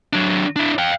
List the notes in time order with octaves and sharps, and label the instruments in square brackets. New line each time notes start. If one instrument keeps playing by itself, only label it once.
[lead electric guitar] F#3 D4
D4 E4
F5 G5